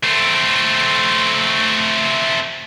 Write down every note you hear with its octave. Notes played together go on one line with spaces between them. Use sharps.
A3 C4